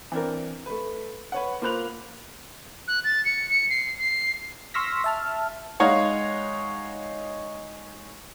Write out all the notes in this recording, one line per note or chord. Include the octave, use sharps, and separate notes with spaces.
E3 C4 D4 A#4
A3 B4
B4 C#5 F#5
A#3 F4 C5 B5 F#6 F7
F#6
A6
C#7
C#7
C7
C7
C6 C#6 E6 F6 A#6 B6
E5 A5 F6
G#3 D#4 C#5 F5 F#5